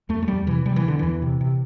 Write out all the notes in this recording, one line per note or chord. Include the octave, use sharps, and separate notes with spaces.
E2 A3
A3
E2 G3
C3 E3
C3 G3
E3
E2 D3
E2 E3
C3
C3